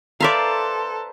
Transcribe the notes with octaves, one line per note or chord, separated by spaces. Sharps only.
A4 B4 C5 D5 E5 F5 A#5